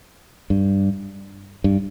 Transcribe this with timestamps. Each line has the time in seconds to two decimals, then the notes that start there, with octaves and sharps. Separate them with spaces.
0.50 G2
1.64 G2